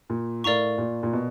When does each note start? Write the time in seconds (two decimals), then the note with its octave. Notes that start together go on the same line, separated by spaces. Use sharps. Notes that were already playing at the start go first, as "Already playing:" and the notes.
0.10 A#2
0.44 A2 A#4 D5 F5 A#5 C#6
0.78 A#2
1.03 A#2
1.13 B2